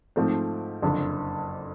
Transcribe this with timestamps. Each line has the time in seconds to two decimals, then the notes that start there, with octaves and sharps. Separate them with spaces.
0.16 G#2 F3 A3 C4
0.82 F#1 F2 D3